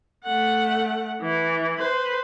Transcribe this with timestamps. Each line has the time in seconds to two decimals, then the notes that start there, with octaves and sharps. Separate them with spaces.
0.24 A3 F#5
1.22 E3
1.78 B4 C5